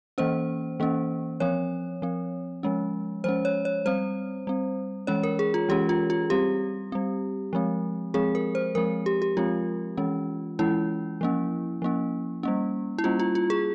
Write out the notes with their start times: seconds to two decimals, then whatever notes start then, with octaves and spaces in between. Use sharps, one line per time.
0.18 E3 A#3 C#4 C5
0.80 E3 A#3 C#4
1.40 F3 C4 C#5
2.02 F3 C4
2.63 F3 G#3 C#4
3.24 F3 G#3 C#4 C5
3.45 C#5
3.65 C#5
3.86 G3 C4 C5
4.47 G3 C4
5.07 E3 G#3 C#4 C#5
5.23 A#4
5.39 G#4
5.54 F4
5.69 E3 G#3 C#4 G4
5.89 F4
6.10 F4
6.30 G3 C4 G4
6.92 G3 C4
7.53 F3 G#3 C4
8.14 F3 G#3 C4 G#4
8.35 A#4
8.55 C5
8.75 F3 G#3 C4 A#4
9.06 G4
9.22 G4
9.37 F3 G#3 C4 F4
9.97 E3 G#3 C#4
10.59 E3 G#3 C#4 E4
11.21 F3 A#3 C#4
11.82 F3 A#3 C#4
12.43 G3 A#3 C#4
12.98 E4
13.04 G3 A#3 C#4 F4
13.20 F4
13.35 F4
13.50 G#4